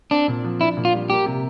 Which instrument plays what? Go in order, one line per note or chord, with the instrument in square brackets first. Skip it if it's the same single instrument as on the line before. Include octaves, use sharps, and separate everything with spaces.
[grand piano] C4 [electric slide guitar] D4
[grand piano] A#2
F3
[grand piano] D4 [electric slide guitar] E4
[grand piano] A#2
[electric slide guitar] F4
[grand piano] G3
[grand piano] A#3 [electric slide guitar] G4
[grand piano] C3